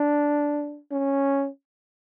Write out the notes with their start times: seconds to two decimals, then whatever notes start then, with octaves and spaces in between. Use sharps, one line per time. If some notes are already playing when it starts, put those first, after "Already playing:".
Already playing: D4
0.92 C#4